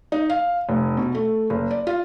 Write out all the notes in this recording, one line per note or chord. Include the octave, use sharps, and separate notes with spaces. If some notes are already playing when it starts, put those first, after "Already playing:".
D#4
F5
F1
B2
A3
F#1
D5
F4